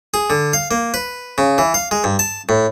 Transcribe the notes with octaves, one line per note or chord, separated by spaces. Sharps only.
G#4
D3
F5
A#3
B4
C#3
E3
F5
G#3
G2
A5
A2